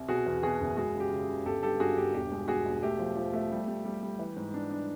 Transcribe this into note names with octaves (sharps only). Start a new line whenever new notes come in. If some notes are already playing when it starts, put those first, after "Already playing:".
Already playing: C2
B2 F#4 G#4
E2
B2 F#4 G#4
F#1
G#3 F#4 G#4
C#3
G4
C#3
C#3
G1 G4 A4
G2 G4 A4
G2 F#4 G#4
G2 G4
E1 G4
G#3
E1 F#4 G#4
E1
A3 G4
F3
F3
A3
G3
G3
G3
G3
E3
G#2
D4
D4